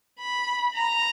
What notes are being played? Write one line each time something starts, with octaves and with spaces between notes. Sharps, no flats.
B5
A#5